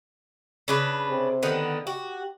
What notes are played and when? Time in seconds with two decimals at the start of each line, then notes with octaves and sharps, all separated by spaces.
0.68 C#3 D4 B4
1.09 C3
1.43 D3 D#3 B3
1.87 F#4 G4